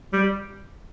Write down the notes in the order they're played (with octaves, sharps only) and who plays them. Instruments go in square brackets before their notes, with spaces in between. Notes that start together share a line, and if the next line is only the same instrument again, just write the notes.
[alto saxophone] G3